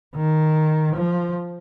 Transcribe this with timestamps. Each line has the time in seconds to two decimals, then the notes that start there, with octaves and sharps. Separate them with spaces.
0.16 D#3
0.95 F3